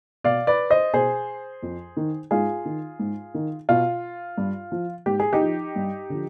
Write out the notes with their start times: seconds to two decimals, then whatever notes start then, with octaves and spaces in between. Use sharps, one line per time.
0.24 B2 D5 F5
0.47 B4 D5
0.70 C5 D#5
0.94 B2 G#4 C5
1.63 F2
1.97 D#3
2.31 G#2 F4 G#4
2.65 D#3
2.99 G#2
3.34 D#3
3.69 B2 F4
4.38 G2
4.72 F3
5.06 G#2 G4
5.20 G#4
5.33 D#4 G4
5.41 F3
5.76 G2
6.10 D3 F3